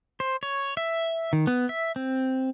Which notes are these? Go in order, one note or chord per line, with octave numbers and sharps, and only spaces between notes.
C5
C#5
E5
D#3
B3
E5
C4